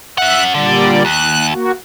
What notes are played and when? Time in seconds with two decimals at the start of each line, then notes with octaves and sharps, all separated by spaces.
0.18 C#4 E5 F#5 F#6
0.54 A#2 D3 G3 D5
1.05 D#2 F#6
1.52 A#3 F#4